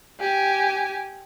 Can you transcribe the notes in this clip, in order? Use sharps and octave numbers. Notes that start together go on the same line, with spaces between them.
G4 G#5